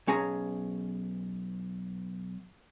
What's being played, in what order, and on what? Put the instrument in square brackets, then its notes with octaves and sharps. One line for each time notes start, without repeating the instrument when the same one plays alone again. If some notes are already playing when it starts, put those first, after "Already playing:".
[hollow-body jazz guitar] B1 C#4 G#4 A#5